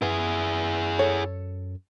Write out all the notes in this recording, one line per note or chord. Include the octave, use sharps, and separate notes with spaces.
F#2 B3 E4 G#4
A4 C#5